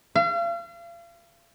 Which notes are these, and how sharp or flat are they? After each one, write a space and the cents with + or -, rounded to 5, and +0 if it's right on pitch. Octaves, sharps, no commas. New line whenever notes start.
F5 -40